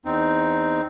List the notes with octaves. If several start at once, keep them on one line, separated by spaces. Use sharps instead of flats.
E2 C4 D#4